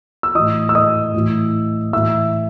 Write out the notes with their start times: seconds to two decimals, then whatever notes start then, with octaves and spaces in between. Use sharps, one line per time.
0.23 E6
0.35 A2 E3 D#5 D#6
0.69 E6
0.75 D#5 D#6
1.14 A2 E3
1.93 A2 E3 E5 E6